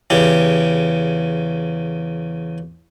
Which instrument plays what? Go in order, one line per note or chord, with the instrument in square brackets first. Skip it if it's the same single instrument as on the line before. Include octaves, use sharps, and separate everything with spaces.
[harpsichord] E2 C#3 G4